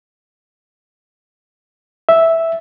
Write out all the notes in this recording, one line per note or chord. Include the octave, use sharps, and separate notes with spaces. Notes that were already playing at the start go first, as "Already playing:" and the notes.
E5